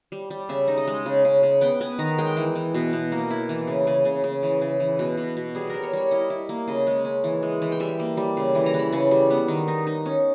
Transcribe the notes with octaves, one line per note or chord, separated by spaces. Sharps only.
G3
G3
C#3 E5
D#4
D#5
G#3
C#3
C#3
C#3
B3 G5
B3 G#5
D#3 A#5
G#3 G5
E3
E3
B2
B2
A#3
E4
E3
C#3
C#3 G#5
C#3
C#3
E3
C#3
E3
B2
B2
B2
G3 G#4
G3 A#4
C#5
G3 C#5
E4 D#5
E4
A#3
C#3 D#5
G#3
C#4
E3
G#3
E3
G5
G3 E5
A#3
G3
C#3
E3
A#5
E3
B5
C#3 C#6
G3
B3
D#3
D#4
D#4
C#4